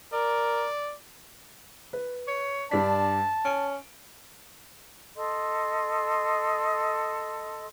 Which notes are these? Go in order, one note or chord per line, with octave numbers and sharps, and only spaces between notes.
A#4 D5
B4
C#5
G2 D4 A5 B6
C#4 D7
A4 D#5 C6